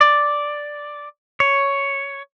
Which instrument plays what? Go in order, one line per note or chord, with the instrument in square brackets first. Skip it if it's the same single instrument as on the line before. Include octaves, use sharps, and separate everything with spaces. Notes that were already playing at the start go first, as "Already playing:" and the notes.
[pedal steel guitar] D5
C#5